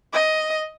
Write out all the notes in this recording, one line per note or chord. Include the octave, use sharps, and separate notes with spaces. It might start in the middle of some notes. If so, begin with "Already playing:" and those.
D#5